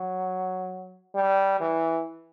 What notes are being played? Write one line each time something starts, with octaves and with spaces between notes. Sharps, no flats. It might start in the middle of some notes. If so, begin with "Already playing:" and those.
Already playing: F#3
G3
E3